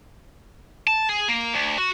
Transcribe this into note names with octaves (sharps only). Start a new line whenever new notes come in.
A5
G#4
A#3
D2
F#4